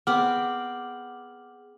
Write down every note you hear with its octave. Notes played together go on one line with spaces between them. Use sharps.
B3 C4 G#4 F#5 D6 F6 F#7